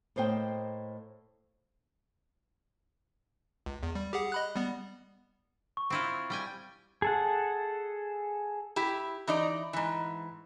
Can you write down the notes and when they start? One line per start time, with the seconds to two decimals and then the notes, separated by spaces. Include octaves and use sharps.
0.16 A2 A#3 C5 D#5 G5
3.66 C#2
3.83 E2
3.95 G3
4.13 G4 G#4 F#5
4.32 D#5 B5 F#6
4.56 G3 B3
5.77 C#6
5.90 C4 E4 F4
6.30 G3 G5 G#5
7.02 G#4 A4 F#5
8.76 E4 G4
9.27 E3 D#4 D5
9.73 G#2 E3